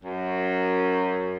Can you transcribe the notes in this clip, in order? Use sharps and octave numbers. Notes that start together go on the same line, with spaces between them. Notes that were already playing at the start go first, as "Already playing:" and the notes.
F#2